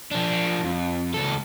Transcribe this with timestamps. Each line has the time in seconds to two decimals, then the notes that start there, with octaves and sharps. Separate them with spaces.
0.11 F3 D4
0.64 F2
1.14 C#2 A4